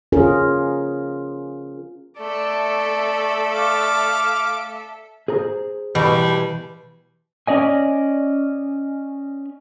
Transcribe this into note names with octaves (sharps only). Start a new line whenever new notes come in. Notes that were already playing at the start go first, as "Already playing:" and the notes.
C#4 F4 G#4 A#4
A3 A4 D5 E5
F5 D6
G#4 C5 A#5
B2 E3 G3
C#4 D5 D#5 G#5